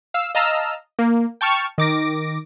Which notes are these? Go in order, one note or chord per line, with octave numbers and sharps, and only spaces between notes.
F5 E6
D#5 F5 A5 A#5 E6 F6
A#3
G5 A5 C#6 F6
D#3 D6 A#6